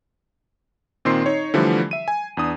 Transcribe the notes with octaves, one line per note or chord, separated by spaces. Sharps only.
A#2 D#3 C4 C6 C7
D#4 C#5
D3 E3 F3 G3 A3
E5 D#7
G#5
E2 D4 D#6